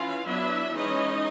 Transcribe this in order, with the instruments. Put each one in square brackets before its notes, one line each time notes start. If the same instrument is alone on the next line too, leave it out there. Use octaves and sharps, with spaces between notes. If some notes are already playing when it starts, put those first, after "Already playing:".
Already playing: [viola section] E3 C#4 F4 F5
F#3 B3 D4 E4 E5
E3 G#3 C#4 D#4 D#5